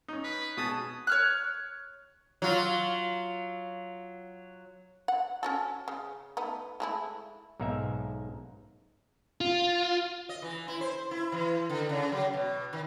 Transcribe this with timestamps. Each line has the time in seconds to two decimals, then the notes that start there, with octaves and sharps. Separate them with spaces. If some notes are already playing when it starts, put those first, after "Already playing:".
0.08 C#4 D#4
0.24 B4
0.57 B2 G#4 A5 D#6
1.07 C#5 F6 F#6
2.42 F#3 F4
5.08 F#5
5.43 C#4 F#4 A4
5.88 C#3
6.37 A3 B3 D#4
6.80 G#3 A3 E4
7.60 B1 G#2 A#3 D#4 A#4 E5
9.41 F4
10.29 D#5
10.42 E3
10.68 E4
10.81 C5
11.11 E4
11.32 E3
11.70 D3
11.89 C#3
12.12 F#3
12.34 B2
12.73 D#3